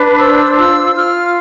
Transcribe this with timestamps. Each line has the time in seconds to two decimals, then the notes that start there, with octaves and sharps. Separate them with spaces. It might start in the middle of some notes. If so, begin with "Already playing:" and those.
Already playing: D4 B4
0.18 C5 E6
0.57 F4 E6
0.95 F4 F6